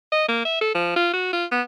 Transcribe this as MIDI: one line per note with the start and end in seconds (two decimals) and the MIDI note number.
0.12 0.26 75
0.28 0.41 58
0.45 0.59 76
0.61 0.72 69
0.75 0.95 53
0.96 1.09 65
1.14 1.31 66
1.33 1.45 65
1.52 1.61 59